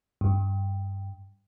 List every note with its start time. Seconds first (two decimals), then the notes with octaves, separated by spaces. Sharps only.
0.21 G2